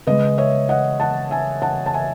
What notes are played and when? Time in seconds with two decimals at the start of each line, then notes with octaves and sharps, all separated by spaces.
0.07 C#3 G#3 B4 D#5
0.38 C#5 E5
0.69 D#5 F#5
1.00 F#5 A5
1.31 E5 G#5
1.62 F#5 A5
1.86 A5
1.94 E5 G#5